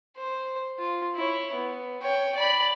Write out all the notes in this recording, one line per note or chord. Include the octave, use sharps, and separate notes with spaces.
C5
F4
E4 C#5
B3
C#5 G5
D5 B5